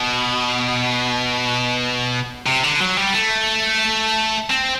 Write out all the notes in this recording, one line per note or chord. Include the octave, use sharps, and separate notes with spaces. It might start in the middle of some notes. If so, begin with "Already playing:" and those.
Already playing: B2
C3
D3
F#3
G3
A3
C4